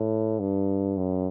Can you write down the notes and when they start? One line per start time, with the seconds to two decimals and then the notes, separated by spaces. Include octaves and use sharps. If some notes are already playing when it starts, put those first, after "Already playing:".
Already playing: A2
0.40 G2
0.97 F#2